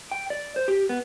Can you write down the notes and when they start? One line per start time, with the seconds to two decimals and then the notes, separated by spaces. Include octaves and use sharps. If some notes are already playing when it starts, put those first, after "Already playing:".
0.11 G5
0.30 D5
0.56 C5
0.68 G4
0.89 B3